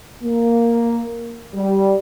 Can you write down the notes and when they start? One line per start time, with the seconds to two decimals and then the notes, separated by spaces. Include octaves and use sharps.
0.22 A#3
1.55 G3